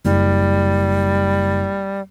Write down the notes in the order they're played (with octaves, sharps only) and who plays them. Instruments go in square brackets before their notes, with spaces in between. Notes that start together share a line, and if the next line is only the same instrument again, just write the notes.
[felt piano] F#1 [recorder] G3